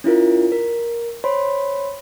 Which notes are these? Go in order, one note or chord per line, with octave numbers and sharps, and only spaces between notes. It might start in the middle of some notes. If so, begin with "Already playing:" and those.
C#4 E4 F4 A#4
A#4
C5 C#5 B5 C6